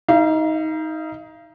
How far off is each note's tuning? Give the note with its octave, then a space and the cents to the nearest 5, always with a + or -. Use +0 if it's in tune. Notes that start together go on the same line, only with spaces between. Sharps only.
D#4 +20 F5 -40